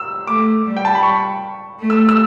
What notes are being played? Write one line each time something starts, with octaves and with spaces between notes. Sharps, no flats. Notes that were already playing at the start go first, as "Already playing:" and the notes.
Already playing: E6
A3 D6
G3
G5
A5
B5
C#6
A3
E6
E6